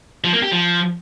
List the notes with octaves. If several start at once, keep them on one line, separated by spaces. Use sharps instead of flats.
F3
A#3
G4
F3